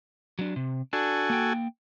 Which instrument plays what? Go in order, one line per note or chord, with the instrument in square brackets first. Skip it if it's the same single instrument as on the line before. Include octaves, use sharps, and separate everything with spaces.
[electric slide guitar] F#3 D4
C3
[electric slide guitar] D4 [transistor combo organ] F#4 A4 G#5
[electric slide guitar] A#3 G5